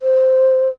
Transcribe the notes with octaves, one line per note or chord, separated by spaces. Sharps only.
C5